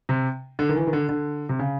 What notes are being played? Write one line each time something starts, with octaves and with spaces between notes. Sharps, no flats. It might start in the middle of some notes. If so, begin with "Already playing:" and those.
C3
D3
D#3
E3
D#3
D3
D3
C3
C#3